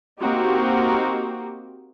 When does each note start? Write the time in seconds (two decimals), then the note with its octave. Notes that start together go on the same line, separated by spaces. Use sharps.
0.20 A#3 C4 D#4 F#4 G4